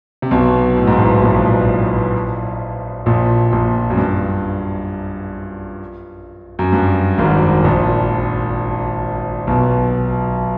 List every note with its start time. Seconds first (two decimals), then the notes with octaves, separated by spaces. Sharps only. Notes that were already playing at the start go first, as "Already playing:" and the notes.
0.22 C3
0.31 B1 B2
0.77 A2
0.87 G#2
0.98 A1 A2
1.22 A#1 A#2
3.06 A#1 A#2
3.52 A#1 A#2
3.90 F#2
3.97 G2
6.59 F#2
6.73 G2
7.18 G#1 G#2
7.64 A#1 A#2
9.47 B1 B2